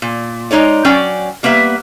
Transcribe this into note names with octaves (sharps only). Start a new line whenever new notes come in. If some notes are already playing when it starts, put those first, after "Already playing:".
A#2
G#3 D#4 C#5 D5
F#3 C#4 D5 G5
G3 A#3 B3 B4 E5